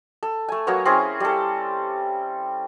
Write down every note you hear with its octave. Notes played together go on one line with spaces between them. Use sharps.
A4
A3 G#5
F#3 A#3 B3 C#5
C4 C#4 E4 G#4
G3 A4